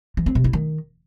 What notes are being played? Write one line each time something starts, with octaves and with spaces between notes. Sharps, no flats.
E3
C4
C3
E4
D#3